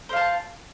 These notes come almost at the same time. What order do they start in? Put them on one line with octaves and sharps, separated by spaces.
C5 F5 A5